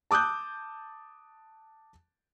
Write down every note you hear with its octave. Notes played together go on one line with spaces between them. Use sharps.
A5 D6 D#6 F#6 G6